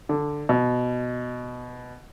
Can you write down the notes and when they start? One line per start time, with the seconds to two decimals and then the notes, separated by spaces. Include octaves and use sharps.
0.09 D3
0.49 B2